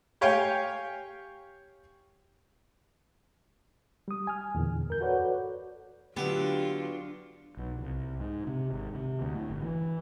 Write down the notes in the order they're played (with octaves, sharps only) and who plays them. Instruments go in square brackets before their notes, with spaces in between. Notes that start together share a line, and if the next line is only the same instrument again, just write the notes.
[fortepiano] G4 C#5 F5 G5 G#5
[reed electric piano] G3 D#6
G#5 F6
E2 A#2 D3
F#2 A#4 G6
F#4 A4 B4 C#5 D5 F#5
[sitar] D3 [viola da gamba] F#3 D4 F4 [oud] B3 E4 [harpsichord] G4
[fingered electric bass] B1
C2
G#2
C3
G#1
C3
D2
A2
G1
E3